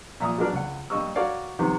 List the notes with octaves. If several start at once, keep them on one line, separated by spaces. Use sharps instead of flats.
A#2 E5 A#5 D#6
F#3 G#3 D4 A#4 B4 D5
C#2 F#5
G2 A#3 D#5 C#6 E6
F#4 A#4 C#5 D5 F5
C3 D#3 B3